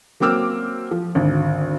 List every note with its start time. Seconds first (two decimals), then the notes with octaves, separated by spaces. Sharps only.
0.20 F#3 A#3 C4 D6 E6 F6
0.91 F3
1.15 G#1 D2